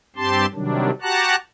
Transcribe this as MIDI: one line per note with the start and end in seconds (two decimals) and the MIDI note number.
0.16 0.46 43
0.16 0.46 60
0.16 0.46 67
0.16 0.46 81
0.16 0.46 84
0.53 0.90 48
0.53 0.90 51
0.53 0.90 54
0.53 0.90 55
0.53 0.90 62
1.02 1.35 66
1.02 1.35 67
1.02 1.35 78
1.02 1.35 81
1.02 1.35 82
1.02 1.35 90